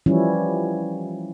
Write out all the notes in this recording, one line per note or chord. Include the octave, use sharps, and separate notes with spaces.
E3 F3 G3 C#4 E4